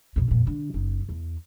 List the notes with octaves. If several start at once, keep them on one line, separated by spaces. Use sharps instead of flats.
E2 B2
F2 A#2
D3
F#1 D#4
E2